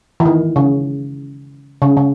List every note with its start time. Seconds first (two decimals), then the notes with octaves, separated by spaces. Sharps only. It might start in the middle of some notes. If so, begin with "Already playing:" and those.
0.20 E3
0.25 D#3
0.56 C#3
1.82 C#3
1.97 C#3